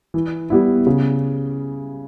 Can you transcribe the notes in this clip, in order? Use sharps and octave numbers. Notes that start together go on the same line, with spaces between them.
E3
G3 B3 E4
C#3